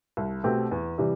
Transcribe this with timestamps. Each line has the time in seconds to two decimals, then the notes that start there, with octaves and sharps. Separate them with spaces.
0.17 C2
0.44 B2 A3 C4 G4
0.71 E2
0.98 C3 E3 G3